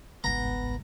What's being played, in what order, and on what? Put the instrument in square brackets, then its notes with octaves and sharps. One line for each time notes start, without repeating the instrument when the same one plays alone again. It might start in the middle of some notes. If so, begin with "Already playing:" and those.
[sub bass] G1 [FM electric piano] C2 G#2 [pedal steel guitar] B3 [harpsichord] A#5